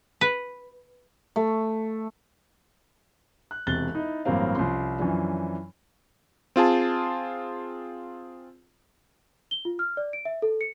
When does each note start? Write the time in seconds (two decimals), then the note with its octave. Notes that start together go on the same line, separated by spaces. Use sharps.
0.21 B4
1.36 A3
3.51 F#6
3.67 E1 C3 F#6 A6 G7
3.95 D#4 E4
4.25 A1 G2 F#3 A#3 C4 F5
4.55 C2 F3 C#4 C6
4.99 F#2 E3 F3 C#4 D4
6.56 C4 F4 G#4 A5
9.51 G7
9.65 F4
9.79 F6
9.97 D5
10.13 D7
10.25 E5
10.42 A4
10.61 C#7